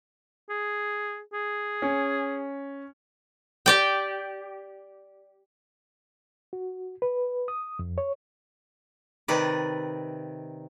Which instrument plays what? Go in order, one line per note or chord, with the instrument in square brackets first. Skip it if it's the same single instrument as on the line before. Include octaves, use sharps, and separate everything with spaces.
[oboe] G#4
G#4
[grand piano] C#4
[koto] G4 D5 G5
[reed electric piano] F#4
B4
D#6
F2
C#5
[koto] C3 D#3 B4 D5